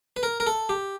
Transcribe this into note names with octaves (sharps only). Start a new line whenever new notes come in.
B4
A#4
A#4
A4
G4